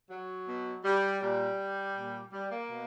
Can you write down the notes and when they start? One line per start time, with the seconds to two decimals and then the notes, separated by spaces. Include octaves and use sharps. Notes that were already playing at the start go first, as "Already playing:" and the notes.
0.09 F#3
0.47 B2
0.83 G3
1.21 A#2 G3
1.95 A#2
2.32 G3
2.51 A#3
2.69 B2